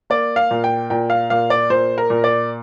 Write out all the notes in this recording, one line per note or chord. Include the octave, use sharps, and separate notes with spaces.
A#3 D5
F5
A#2
G5
A#2 G5
F5
A#2 F5
D5
A#2 C5
A#4
A#2
D5